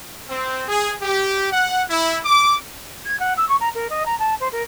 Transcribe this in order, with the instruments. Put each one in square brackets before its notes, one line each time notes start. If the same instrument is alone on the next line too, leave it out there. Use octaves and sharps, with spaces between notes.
[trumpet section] C4
G#4
G4
F#5
E4
D6
[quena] G#6
F#5
E6
C#6
A#5
A#4
D#5
A#5
A5
C5
A#4